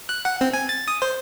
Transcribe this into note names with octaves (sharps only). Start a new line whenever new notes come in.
F#6
F#5
C4
G#5
A6
D#6
C5